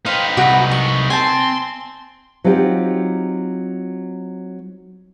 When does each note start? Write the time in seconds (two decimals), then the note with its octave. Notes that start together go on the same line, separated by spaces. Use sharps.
0.06 D#4 B4 C5 F5 G5
0.37 C2 F#4 B5
0.71 C#6
1.10 C4 G#5 A5 C6
2.44 F#3 C4 D#4 F4 G4